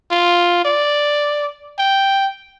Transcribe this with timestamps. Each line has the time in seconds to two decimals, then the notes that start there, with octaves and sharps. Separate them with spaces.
0.11 F4
0.65 D5
1.78 G5